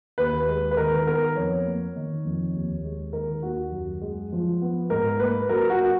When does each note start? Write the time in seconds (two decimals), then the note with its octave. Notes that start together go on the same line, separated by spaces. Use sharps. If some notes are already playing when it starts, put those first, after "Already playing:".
0.18 D#2 B4
0.48 G#3
0.71 B4
0.77 D#3 A#4
1.06 B3 A#4
1.36 F2 C#5
1.66 A#3
1.96 D#3
2.25 F2
2.54 D#2
2.84 G#3
3.13 D#3 A#4
3.43 D#2 F#4
3.72 F#2
4.02 G#3
4.32 F3
4.62 B3
4.90 G#2 A#4
5.20 A#3 B4
5.49 F#3 A#4
5.70 F#4